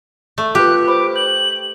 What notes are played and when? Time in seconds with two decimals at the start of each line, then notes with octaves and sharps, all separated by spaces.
0.38 A3
0.55 F4 G4 B4 F#6
0.88 C5 B5 D6
1.16 G6 F#7